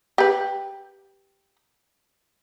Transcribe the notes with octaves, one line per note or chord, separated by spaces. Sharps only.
G4 B4